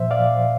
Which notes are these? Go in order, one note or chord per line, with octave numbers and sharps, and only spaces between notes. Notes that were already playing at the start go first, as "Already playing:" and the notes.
Already playing: A#2 F3 C5 E5
D5 F5